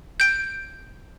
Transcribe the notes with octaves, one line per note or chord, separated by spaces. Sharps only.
G6 D7